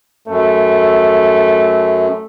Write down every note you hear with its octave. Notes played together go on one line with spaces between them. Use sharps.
F#2 A3